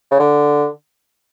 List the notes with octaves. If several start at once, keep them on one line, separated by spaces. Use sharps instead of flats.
C#3
D3